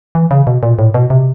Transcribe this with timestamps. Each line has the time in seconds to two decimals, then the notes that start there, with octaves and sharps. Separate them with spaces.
0.15 E3
0.31 C#3
0.47 B2
0.63 A#2
0.79 A2
0.94 B2
1.10 C3